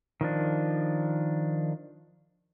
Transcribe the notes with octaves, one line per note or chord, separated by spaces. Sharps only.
D#3 F3 D4